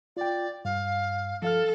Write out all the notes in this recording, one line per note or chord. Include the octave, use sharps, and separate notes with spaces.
F4 D5 G5
G2 F5
F3 A4 F5 F6